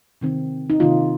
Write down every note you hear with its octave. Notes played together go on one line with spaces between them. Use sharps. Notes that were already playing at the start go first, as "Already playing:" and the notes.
C3 D#3 C4
D#4
C3 D#3 A#3 F4